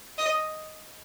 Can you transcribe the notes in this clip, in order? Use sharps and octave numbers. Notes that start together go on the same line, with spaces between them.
D#5